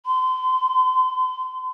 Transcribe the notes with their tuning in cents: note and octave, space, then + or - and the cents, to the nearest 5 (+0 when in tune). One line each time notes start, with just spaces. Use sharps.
C6 -35